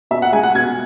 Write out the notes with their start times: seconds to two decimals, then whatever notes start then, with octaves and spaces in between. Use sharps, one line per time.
0.11 B2 E5
0.22 F#5
0.32 G#3 G#5
0.43 F#5
0.55 B2 G#6